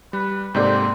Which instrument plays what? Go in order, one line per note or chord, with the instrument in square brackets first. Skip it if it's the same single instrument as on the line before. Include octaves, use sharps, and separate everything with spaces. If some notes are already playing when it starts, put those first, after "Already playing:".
[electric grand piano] G3 [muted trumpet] B4
[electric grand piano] G#2 C3 A#3 [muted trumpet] C4 [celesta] A4 D5 G6